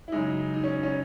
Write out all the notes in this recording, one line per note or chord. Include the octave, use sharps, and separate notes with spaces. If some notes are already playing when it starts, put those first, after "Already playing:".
E4
F#2 C#3 G#3 D#4
D#4
C#4
C#4